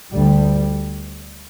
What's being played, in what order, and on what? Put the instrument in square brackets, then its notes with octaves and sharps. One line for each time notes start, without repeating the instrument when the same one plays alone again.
[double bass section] D2 G3